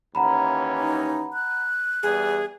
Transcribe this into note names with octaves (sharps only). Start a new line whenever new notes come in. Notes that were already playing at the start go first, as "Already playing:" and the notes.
D#2 E3 C#4 F#5 A#5 B5
D#4
F#6
E2 E3 G3 G#4